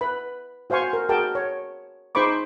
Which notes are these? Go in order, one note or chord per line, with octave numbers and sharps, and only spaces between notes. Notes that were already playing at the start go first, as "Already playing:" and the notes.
B4 B5
F#4 C5 F5 G#5 C#6
A#4
F#4 G#4 A#4 G5 A5
C#5
D#4 G#4 C5 B5 C#6 D6